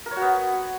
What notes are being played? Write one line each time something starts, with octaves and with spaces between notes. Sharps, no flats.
A#4
C#5
F#4
B3